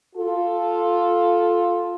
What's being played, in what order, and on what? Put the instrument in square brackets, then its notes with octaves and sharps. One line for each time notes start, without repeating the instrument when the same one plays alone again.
[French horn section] F4 A4